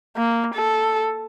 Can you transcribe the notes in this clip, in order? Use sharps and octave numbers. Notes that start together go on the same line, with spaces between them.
A#3
A4